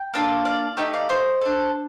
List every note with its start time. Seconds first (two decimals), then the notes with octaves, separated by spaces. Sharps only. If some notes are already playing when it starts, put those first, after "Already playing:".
Already playing: G5
0.14 A#3 D4 F4 A4
0.45 D5 F5
0.77 A3 D#4 G4 D#5 G5
0.93 D5 F5
1.09 C5 D#5
1.41 D4 A4